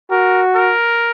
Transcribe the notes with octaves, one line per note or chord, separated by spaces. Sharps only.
F#4 A#4
A#4